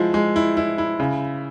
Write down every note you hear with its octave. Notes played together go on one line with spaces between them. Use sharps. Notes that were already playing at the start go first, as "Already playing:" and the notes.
Already playing: F3 G#3 E4
G#3
E4
E4
E4
C#3